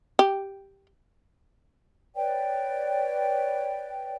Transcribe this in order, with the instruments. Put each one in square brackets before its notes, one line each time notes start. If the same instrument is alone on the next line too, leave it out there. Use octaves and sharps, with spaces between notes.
[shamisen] G4
[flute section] B4 C#5 D5 G5